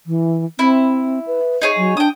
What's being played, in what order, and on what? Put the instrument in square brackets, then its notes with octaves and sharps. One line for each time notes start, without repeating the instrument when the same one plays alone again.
[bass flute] E3
[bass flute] C4 [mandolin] E4
[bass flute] B4
[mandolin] D#4 G#4 C#5
[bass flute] F#3
[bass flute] D4 [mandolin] G5 D#6